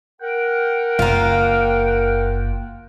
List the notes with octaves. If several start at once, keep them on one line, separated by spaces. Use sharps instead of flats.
A#4 F#5 G5
F#1 A#3 F4